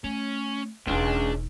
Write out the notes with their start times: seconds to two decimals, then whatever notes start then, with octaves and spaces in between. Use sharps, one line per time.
0.04 A3 C#4
0.87 E1 C#2 D4 D#4